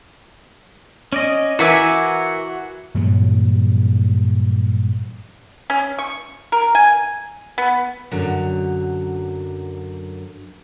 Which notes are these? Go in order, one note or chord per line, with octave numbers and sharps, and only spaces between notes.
C#4 D5 D#5
E3 F#4 A#4 E5 F#5 G#5 D6
G2 A#2 E3 F#3
C#4
C#6
A#4
G#5
B3
F#2 D3 F#3